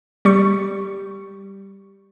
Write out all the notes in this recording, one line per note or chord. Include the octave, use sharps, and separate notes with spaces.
G3 C#6